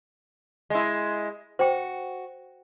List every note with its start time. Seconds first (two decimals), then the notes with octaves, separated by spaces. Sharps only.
0.70 G#3 E4
1.59 F#4 C5 G5